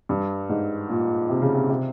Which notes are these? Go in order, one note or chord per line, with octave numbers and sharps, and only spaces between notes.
G2
G#2
A#2
C3
C#3
C3
C3